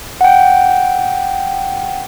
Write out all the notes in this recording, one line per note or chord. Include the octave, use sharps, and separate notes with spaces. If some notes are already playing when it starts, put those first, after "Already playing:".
F#5 G5